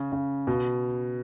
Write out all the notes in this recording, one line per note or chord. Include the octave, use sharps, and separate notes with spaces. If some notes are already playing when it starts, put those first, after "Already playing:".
Already playing: C#3
C#3
B2